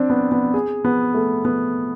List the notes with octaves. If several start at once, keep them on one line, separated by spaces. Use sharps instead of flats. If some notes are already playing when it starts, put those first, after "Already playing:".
Already playing: C4 D4
B3
B3
G#4
B3
A3
B3